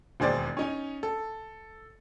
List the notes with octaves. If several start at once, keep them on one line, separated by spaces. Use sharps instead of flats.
E1 D#2 G#4 C5 D5 A6
C#4 D#4 G#5
A4